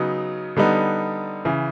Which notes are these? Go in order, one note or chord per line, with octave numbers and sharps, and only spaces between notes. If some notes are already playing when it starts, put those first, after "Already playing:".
Already playing: C#3 F#3 B3 D#4
D3 G3 B3 D#4
C#3 E3